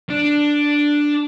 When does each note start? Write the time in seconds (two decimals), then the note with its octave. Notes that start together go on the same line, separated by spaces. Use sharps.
0.10 D4